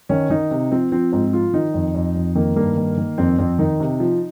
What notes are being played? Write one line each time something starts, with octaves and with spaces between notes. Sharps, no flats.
D#3 C#4
D#3 D#4
C3
F3 C4
F3 C4
G#2 C4
F3 F4
D#3 D#4
F2
F2
F2
D#3 A#3
G2 A#3
D#3
D#3
F2 C4
F2 C4
D#3 D#4
C3
F3